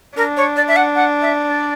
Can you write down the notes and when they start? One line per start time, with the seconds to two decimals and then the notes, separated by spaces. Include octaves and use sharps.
0.16 D4 A#4
0.36 C#5
0.56 D5
0.68 E5
0.76 F#5
0.95 F#5
1.21 E5
1.48 D5